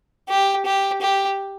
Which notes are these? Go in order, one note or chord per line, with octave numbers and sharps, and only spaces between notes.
G4
G4
G4